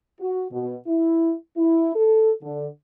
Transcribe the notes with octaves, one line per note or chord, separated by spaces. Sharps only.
F#4
B2
E4
E4
A4
D3